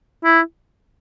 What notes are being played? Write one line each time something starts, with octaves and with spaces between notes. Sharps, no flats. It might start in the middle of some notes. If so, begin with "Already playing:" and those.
E4